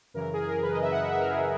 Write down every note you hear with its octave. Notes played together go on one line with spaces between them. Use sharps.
F#2 C#3 E3 A#4
G#4
A#4
G#4
B4
D#5
E5
F#5
E5
E5
A#4
G#4